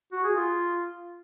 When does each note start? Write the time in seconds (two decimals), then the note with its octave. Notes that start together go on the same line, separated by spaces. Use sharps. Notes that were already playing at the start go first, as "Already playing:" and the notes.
0.12 F#4
0.24 G#4
0.35 F4